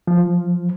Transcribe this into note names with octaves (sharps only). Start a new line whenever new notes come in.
F3